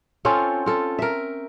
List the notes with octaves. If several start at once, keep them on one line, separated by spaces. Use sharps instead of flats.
C4 C#4 F4 A4
F4 A4
A#4 E5